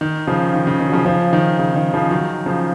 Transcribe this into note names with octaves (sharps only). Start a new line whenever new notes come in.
D#3
C#3 F3
D#3
C#3
D#3
F#3
C#3 F3
C#3 F3
D#3
C#3
D#3
C#3 F3
D#3 F#3
C#3 F3